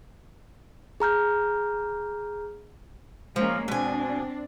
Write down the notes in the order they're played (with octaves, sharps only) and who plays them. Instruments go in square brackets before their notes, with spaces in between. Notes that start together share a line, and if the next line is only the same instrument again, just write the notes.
[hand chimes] G#4 A#5 F6 G6
[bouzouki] F3 [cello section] G#3 A#3 C#4
[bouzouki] B2 G#5 [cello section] C4 D4